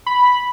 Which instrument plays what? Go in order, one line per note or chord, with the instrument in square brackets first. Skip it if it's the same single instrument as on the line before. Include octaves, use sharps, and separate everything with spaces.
[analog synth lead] B5